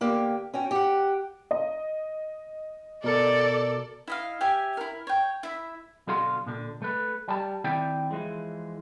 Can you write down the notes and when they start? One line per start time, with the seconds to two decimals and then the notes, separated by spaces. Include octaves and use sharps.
0.01 D3 A#3 G4
0.54 C#4 F#4 G5
0.71 G4 F#5
1.51 D#5
3.04 B2 A4 A#4 D5 C#7
4.08 E4 D#5 F5
4.41 G4 C#5 E5 G#5
4.77 E4 A#4
5.07 C#5 G5
5.43 E4 E5
6.07 B1 D3 F#4 F5 C6
6.46 A#2 D3
6.82 A3 B4
7.28 G3 A5
7.64 D#3 C4 E4 D5 G5
8.11 E3 F3 G#3